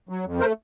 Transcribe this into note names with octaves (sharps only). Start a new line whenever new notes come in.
F#3
F2
A3 A#4 C5